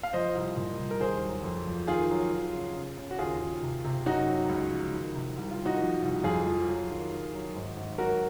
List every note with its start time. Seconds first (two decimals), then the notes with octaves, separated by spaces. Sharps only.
0.03 F5
0.13 F3 C5 D#5
0.35 C2
0.57 A#2
0.79 C2
0.91 A#4
1.00 D#2 G#4 C5
1.22 F#3
1.43 F2
1.66 F3
1.87 D#3 F4 G#4
2.10 F#3
2.32 F#3
2.53 C#3
2.75 C#3
2.97 C#3
3.11 F#4
3.19 D#2 F4 G#4
3.41 D#2
3.63 C3
3.84 C3
4.06 F#2 D#4 F#4
4.28 F#3
4.49 C#2
4.71 F3
4.93 D#3
5.15 C3
5.37 C2
5.51 F4
5.59 D#3
5.65 D#4 F#4
5.81 F3
6.02 C2
6.24 F2 F4 G#4
6.46 F3
6.68 F#3
6.90 D#3
7.12 D#3
7.34 F#3
7.56 G#1
7.76 G#1
7.98 F#3 F#4 A#4